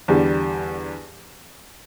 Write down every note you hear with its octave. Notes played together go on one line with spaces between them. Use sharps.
E2 D3 G3